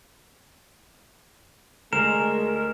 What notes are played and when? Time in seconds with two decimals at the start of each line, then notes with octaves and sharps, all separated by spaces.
1.93 D2 G#3 A#4 G#5 C7 E7